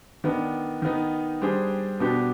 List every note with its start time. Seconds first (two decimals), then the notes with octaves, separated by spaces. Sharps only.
0.24 D#3 B3 D4
0.82 D#3 B3 D#4
1.42 G3 D4 G#4 C5
2.00 B2 B3 D4 G4